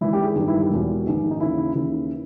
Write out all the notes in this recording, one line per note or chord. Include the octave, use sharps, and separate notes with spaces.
G#1 G#2 E3 E4
G4
G#4
G1 G2 D#3 G4
E4
G4
E1 E2 B2
A#1 G#2 D#3
D#4
D#2 C#3 E3 E4
D#2 C#3 E3 E4